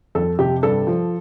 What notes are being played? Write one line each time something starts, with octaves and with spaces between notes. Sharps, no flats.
F2 A4
C3 G4
G2 A4
F3